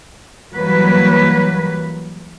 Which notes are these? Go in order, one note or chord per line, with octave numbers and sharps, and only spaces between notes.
E3 F#3 G3 A#3 B4